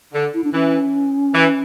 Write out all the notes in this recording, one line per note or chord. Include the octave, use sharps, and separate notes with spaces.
D3
E4
D4
E3 C#4
E3